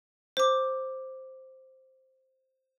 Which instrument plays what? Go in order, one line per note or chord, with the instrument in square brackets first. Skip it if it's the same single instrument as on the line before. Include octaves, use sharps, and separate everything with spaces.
[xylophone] C5 D6